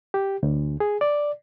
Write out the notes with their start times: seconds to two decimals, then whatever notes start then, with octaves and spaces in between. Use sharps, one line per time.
0.14 G4
0.43 D2
0.80 G#4
1.01 D5